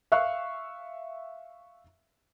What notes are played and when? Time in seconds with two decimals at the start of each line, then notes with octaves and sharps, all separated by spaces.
0.12 E5 F5 C#6 F#6